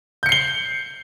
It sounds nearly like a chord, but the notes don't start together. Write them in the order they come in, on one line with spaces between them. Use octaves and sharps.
G6 C#7 C7 G7